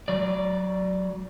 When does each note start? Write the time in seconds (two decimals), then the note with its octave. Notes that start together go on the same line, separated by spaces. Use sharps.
0.08 F#3 D5